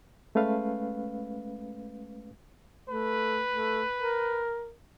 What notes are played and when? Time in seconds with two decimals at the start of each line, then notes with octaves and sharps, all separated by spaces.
0.35 G#3 A3 C#4 B4 F5
2.89 A3 B4
3.51 A3
3.98 A#4